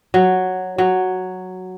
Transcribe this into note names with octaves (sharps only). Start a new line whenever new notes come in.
F#3
F#3